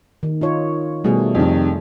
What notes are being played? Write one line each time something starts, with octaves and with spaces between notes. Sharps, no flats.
D#3
D#4 F4 C#5
B2 G3 A3 G#4
F2 C3 D#3